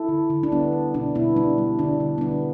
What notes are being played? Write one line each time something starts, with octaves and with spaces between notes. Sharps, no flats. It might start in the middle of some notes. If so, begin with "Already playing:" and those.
Already playing: E4 A4
D3
D3
D4
G3 B3
G3
B2 D4
B2 B3 E4
G3 D4
G3
D3 D4
D3
B3
G3 D4